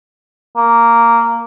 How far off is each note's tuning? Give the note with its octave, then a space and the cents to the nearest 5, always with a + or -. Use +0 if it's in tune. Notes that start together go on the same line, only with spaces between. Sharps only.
A#3 -5